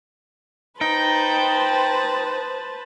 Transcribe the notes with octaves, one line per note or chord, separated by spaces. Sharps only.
D#4 B4 C5 G5 A5